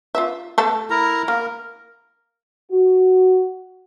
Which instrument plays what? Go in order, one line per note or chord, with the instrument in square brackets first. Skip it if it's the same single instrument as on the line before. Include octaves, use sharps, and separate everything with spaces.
[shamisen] F4 E5
A3 A4 A5
[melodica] E4 A#4 A#5
[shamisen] A#3 [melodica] A#4
[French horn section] F#4